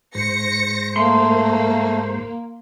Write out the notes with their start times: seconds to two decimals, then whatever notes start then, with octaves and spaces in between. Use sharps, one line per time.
0.15 G#2 C5 A#6 C#7
0.96 A3 A#3 C6